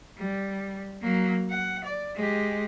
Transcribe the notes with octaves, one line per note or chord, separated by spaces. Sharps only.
G3
F#3 A#3
F#5
D5
G#3 G4